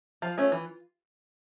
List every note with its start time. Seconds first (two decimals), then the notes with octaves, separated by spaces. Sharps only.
0.22 F3 F4
0.38 A3 C#4
0.52 E3